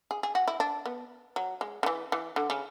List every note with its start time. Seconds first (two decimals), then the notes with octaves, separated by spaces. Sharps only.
0.11 G#4
0.23 G#4
0.35 F#4
0.48 E4
0.60 D4
0.86 B3
1.36 F#3
1.61 G#3
1.83 D3
1.86 E3
2.12 E3
2.36 D3
2.50 C#3